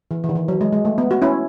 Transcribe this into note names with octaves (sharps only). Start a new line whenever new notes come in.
E3
E3
D#3
E3
F#3
G#3
G#3
A3
B3
F#4
C#4 E4